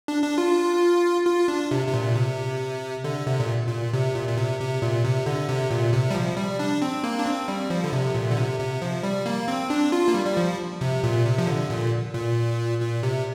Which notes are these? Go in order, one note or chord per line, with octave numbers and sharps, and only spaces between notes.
D4
D4
F4
F4
D4
C3
C3
A#2
C3
D3
C3
A#2
A#2
C3
A#2
A#2
C3
C3
A#2
C3
D3
C3
A#2
C3
G3
F3
G3
D4
C4
A#3
D4
C4
G3
F3
D3
C3
A#2
D3
C3
C3
F3
G3
A#3
C4
D4
F4
A#3
G3
G3
F3
C3
A#2
C3
F3
D3
A#2
A#2
A#2
C3